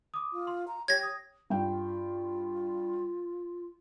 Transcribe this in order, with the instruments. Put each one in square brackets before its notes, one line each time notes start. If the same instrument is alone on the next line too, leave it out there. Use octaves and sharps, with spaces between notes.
[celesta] D6 D#6
[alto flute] F4
[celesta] C6
[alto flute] A#5
[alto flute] G4 [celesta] C#5 [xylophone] G#6 A#6
[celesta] D#6
[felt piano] G2 G5 [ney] F4